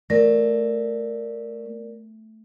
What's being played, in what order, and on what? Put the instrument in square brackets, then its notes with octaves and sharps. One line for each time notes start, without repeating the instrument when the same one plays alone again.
[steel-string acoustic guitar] A3 [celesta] A#4 D5 A#6